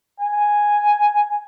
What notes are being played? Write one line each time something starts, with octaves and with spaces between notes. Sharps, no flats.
G#5